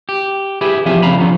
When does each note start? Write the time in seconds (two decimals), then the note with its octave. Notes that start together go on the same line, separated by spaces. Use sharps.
0.09 G4
0.61 E4 G4 G#4 B4
0.86 E3 F3 C4 G4 E5 G#5
1.02 F2 C#3 F5 A#5 B5
1.18 D3 F3 B3 C#4